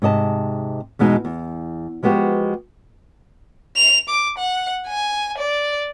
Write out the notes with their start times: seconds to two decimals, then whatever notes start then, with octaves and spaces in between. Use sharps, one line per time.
0.02 G#2 C3 D#5 A5
0.99 E2 B2 G#3 D#4
1.25 E2
2.03 F3 G#3 B3 F#4 G4
3.76 F7
4.09 D6
4.38 F#5
4.87 G#5
5.38 D5